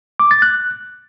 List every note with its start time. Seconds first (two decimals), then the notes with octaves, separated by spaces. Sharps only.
0.20 D6
0.31 A6
0.42 F#6